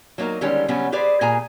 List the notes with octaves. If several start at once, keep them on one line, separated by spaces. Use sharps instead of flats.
F#3 A#3 D#4 A#4
D3 D#3 G3 G#3 C#4
C#3 F#3 G3 B3 C#4
G4 G#4 B4 C5 D5
A#2 G#4 G#5 A#5